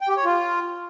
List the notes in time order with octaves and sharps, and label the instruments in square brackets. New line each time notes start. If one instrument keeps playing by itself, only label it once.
[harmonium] G5
G4
C#5
F4